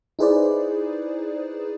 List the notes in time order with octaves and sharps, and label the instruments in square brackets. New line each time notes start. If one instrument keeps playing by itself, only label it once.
[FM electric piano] D#4 E4 G#4 B4 C5 D5